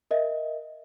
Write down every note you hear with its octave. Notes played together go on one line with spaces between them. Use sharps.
A#4 D#5 E5